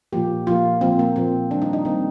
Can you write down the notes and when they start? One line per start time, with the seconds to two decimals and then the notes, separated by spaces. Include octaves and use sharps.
0.13 A#2 F3 A#3 G4
0.46 A#2 F3 A#3 F4
0.81 A#2 F3 A#3 C4
0.99 A#3
1.16 A#2 F3 A#3 C4
1.51 D#3 G3 A#3 D4
1.62 D#4
1.73 D#4
1.85 D#3 G3 A#3 C4